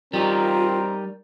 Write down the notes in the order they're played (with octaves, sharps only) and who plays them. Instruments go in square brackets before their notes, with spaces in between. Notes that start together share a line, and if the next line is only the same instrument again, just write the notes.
[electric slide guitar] G3 D#4 [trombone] C4 [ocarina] F4 [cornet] A#4